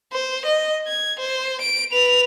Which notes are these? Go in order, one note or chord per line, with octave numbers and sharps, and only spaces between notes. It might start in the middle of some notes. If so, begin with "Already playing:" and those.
C5
D#5
G#6
C5
D7
B4 F7